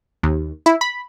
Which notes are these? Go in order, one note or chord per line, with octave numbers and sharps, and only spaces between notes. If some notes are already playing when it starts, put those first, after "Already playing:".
D#2
E4
B5